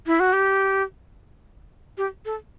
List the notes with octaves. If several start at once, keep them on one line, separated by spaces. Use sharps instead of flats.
E4
F#4
G4
G4
A4